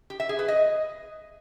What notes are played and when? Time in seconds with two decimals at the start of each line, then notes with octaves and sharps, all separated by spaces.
0.10 G4
0.20 E5
0.29 G#4
0.39 B4
0.48 D#5